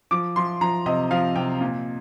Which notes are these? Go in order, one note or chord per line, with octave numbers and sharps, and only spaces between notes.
F3 D6
F3 C6
F3 A#5
C3 D#5
F3 F5
C3 G5
A#2